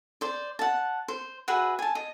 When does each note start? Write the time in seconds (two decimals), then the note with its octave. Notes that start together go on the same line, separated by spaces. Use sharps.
0.21 C5 D5
0.59 F#5 A5
1.08 C5
1.48 F#4 G#4 B4 E5
1.79 G#5 A5
1.95 D#5